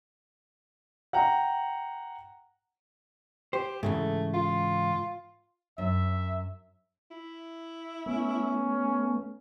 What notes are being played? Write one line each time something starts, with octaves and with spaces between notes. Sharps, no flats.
F#5 G5 A#5
G4 C5
G#2 C#3 E3 A3
F4
F#2 E5
E4
A3 B3 C#4